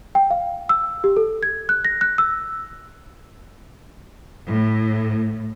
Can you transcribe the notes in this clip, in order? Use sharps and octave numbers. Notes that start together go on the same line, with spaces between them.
G5
F5
E6
G4
A4
G#6
F#6
A#6
F#6
E6
A2